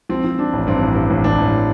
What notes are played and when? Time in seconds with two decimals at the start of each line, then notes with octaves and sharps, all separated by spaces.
0.09 F3 C4
0.24 F3
0.39 F3 D4
0.53 A1
0.67 G2 C4
0.82 A1
0.95 G2
1.10 A1
1.24 A1 D4
1.38 A1